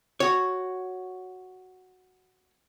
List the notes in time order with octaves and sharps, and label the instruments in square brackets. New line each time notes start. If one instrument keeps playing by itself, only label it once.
[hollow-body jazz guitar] F#4 C#5